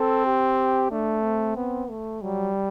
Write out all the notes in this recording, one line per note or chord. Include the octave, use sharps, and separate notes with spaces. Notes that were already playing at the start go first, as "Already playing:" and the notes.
Already playing: C4 A4
G4
A3 D4
C4
B3
A3
F#3 G3